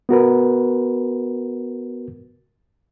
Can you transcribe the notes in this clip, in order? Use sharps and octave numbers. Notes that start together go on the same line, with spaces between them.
B3 F#4 A#4 B4